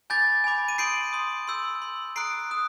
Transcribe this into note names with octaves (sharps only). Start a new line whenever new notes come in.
G#5 B5 D6 G6 A6
G#5 B5 D6
D#7
C6 D#6 G6 C7 D7
C6 D#6 G6
C6 E6 G6
C6 E6 G6
A#5 D#6 F#6 C7 D7
A#5 D#6 F#6